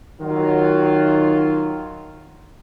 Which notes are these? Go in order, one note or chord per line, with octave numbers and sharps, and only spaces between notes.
D#3 F#3 F4